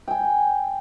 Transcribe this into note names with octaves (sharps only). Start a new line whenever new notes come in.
G5 G#5